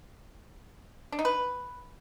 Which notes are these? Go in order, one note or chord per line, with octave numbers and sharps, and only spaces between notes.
D4
D#4
B4